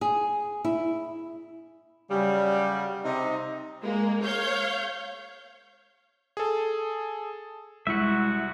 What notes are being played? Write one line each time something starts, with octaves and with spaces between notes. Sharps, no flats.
G#4
E4
C#3 F#3 G3
C3 D#4
G#3 A#3
C#5 F5 G6
G#4 A4
C2 G#3 E4 F#4 E5 C#7